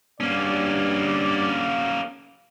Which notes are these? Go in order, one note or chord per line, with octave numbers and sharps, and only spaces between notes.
G2 A#3 C#4 D5